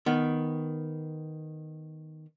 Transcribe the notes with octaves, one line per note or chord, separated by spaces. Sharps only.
D#3 B3